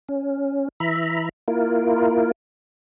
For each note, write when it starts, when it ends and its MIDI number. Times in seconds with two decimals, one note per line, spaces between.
0.09 0.68 61
0.80 1.29 52
0.80 1.29 76
0.80 1.29 82
0.80 1.29 83
1.48 2.31 58
1.48 2.31 64
1.48 2.31 65
1.48 2.31 70